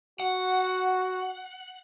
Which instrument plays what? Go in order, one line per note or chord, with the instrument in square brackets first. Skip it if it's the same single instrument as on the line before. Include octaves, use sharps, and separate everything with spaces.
[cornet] F#4 [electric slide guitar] F#5